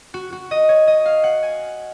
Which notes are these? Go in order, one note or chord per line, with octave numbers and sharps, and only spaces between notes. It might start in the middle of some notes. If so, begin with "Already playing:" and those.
F#4
F#4
D#5
C#5
D#5
F5
F#5
G#5